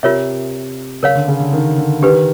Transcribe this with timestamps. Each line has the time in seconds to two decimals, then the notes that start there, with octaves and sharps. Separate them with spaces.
0.03 C3 F4 A#4 C#5 E5
1.03 C#3 A#4 C#5 F5
1.15 D3
1.28 C#3
1.40 D3
1.53 D#3
1.78 D3
2.02 D#3 D4 G4 B4